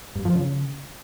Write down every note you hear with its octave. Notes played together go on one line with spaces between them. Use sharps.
G2
F3
C#3